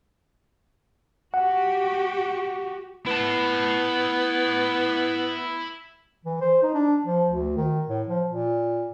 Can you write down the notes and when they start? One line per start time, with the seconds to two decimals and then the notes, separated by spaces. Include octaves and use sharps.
1.34 F#4 G4 F#5
3.07 B3 E4 A5
6.25 E3
6.41 C5
6.63 D#4
6.74 D4
7.06 F3
7.30 D2
7.57 D#3
7.89 A2
8.08 F3
8.28 A#2